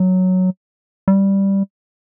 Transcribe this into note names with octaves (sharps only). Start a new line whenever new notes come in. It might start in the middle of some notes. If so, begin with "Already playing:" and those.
Already playing: F#3
G3